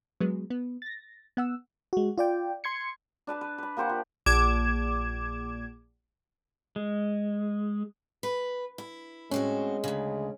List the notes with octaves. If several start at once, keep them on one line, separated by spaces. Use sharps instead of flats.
F#3 G#3 B3
B3
A6 A#6
B3 F#5 E6
G#3 F#4
F4 D5 G5
C6 G#6 C#7
D4 B4 A5 B5
B4
B4 B5
A#3 G4 C5 F#5
F3
A#1 D6 G#6 E7
G#3
B4
E4
A2 G#3 C4 C#4 F#4
D2 C#3